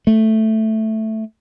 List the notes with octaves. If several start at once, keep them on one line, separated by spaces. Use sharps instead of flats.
A3